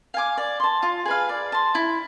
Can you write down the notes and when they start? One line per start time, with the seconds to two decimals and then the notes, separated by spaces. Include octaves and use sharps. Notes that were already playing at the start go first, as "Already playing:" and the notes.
0.14 F5 G#5 D6
0.37 D5
0.60 A5 C6
0.83 F4
1.05 G#4 B4 F5
1.29 D5
1.52 A5 C6
1.75 E4